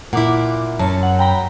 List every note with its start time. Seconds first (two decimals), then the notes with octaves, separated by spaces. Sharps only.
0.13 A#2 E4 F#5 D6
0.79 F#2 C#5 A5
1.03 F#5
1.19 G5 A#5 B5